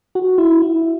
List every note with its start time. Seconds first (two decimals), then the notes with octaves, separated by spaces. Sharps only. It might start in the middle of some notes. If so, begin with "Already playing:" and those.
0.15 F#4
0.38 E4
0.62 E4